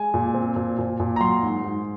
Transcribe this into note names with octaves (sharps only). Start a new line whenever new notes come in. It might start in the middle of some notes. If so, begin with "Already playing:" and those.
Already playing: G#3 G#5
A#2
C4
A#2
A#2
A#2
A#5
F#3 C6
G#2
G#2